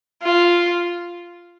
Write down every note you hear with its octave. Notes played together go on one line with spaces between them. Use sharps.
F4